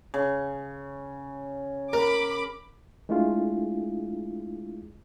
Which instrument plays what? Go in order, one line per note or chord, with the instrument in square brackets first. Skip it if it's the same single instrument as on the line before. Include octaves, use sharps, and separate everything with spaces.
[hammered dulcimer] C#3
[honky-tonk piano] A#4 [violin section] B5 D6
[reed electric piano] G#3 A3 D4 E4 F4 G#4